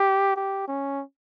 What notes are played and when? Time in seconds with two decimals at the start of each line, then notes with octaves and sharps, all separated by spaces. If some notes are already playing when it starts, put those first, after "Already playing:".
Already playing: G4
0.36 G4
0.68 C#4